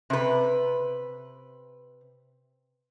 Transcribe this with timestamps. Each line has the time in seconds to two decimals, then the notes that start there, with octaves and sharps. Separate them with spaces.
0.10 C3 B4